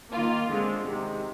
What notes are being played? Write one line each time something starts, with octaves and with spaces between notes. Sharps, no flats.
D#3 A#3 F4
D3 G#3 C4
C3 D#3 G#3